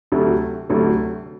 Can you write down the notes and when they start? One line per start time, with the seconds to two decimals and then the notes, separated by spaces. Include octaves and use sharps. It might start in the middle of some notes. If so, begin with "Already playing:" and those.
0.12 D2 C3 F#3 A3
0.69 D2 C3 F#3 A3